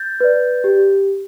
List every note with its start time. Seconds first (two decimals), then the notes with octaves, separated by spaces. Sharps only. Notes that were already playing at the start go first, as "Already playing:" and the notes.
Already playing: G6 A6
0.20 B4 D5
0.64 G4